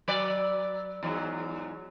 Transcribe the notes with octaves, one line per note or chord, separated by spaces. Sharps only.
F#3 B4 D5
E2 G#2 F#3